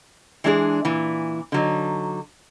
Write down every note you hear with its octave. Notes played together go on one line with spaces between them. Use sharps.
E3 G#3 D4 G#4
A#2 E3
D3 F#3 D#4